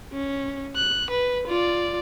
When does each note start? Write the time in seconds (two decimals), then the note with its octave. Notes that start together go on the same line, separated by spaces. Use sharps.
0.12 C#4
0.76 F#6
1.10 B4
1.47 F4 D5